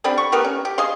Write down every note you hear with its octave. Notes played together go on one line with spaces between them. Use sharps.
D3 G3 C4 B5
C#6
A3 B3 G4 A#4
C#4
G4
G#4 D#5 F5 C6